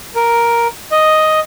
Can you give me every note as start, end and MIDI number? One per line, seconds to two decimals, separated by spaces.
0.15 0.67 70
0.91 1.40 75